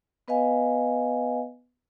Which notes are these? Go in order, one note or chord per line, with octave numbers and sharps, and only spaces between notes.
B3 B4 D#5 F5 G#5